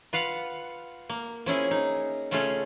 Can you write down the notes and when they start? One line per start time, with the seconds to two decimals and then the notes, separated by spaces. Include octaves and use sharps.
0.13 F4 B4 F5 F#5
1.09 A#3
1.46 F3 C#4 E4 G#4
1.71 D#4
2.31 C#3 A3 C#4 F4 G#4